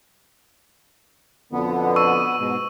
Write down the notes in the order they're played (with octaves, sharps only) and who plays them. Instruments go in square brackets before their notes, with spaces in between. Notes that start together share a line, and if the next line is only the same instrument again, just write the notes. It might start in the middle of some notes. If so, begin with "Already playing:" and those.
[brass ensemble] F2 B2 D3 [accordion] B3
[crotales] C#6 E6 D#7
[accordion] G#2 B2